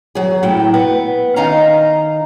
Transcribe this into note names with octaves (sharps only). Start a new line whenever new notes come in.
F#3 G#4
A2 F#3 E4 G5
B3
D#3 D#4 D#5 F5 G#5 A#5